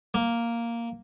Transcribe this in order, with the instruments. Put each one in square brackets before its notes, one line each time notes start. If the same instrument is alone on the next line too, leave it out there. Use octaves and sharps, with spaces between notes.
[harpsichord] A#3